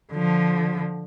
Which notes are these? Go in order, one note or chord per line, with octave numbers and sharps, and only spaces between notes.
D3 F3